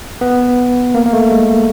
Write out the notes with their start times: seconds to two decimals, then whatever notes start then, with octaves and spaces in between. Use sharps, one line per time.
0.21 B3
0.95 A#3
1.06 A#3
1.13 A3
1.31 G#3